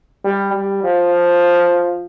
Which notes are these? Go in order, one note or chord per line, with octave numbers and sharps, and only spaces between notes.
G3
G3
F3